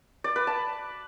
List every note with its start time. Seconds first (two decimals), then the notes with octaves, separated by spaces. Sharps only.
0.24 D5
0.36 B4
0.47 A5